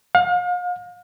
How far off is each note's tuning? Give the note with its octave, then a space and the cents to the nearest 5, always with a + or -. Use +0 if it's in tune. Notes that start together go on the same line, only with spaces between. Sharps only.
F5 +40